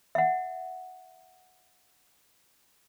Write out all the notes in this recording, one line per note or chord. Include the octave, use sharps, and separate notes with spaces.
E5 F#5